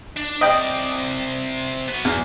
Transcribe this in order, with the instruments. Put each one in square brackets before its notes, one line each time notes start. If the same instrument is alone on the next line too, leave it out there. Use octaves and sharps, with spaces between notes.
[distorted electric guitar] D4
[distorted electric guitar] C3 D5 [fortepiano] D#5 G5
[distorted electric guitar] F#3 B3
[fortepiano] E2